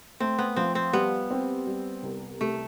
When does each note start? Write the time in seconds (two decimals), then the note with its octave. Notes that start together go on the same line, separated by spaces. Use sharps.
0.20 A3 C4
0.39 B3
0.56 F3 C4
0.75 C4
0.93 G3 B3
1.31 C4
1.67 G3
2.03 C2
2.40 C3 A3